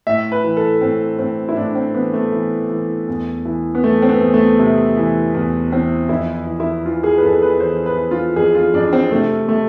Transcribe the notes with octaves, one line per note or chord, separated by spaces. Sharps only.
A2 E5
B4
E3
A4
A2 C4
A2 C4
E4
A2 D4
C4
E3 B3
A3
E3
E3
E2
E3
B3
E3 A3
C4
B3
E2
A3
C3
E3
E2
E3 C4
F2 E4
E3
E4
E3 F4
G#4
B4
F2 A4
B4
E3 C5
B4
E3
F4
F2 G#4
F4
F2 D4
C4
C3 A3
C3 A3